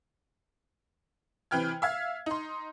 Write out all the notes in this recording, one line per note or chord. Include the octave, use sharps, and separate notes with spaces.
C3 E3 B4 G5 F6 G#6
E5 F5 G#6
D#4 C6